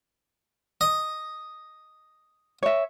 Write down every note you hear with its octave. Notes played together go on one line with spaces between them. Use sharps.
D#5
C#5 E5